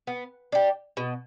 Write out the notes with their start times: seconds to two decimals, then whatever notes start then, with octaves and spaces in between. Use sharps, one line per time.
0.07 B3
0.52 D4 G4
0.97 B2